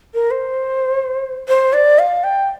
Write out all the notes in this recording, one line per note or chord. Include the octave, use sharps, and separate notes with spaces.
A#4
C5
C5
D5
F5
G5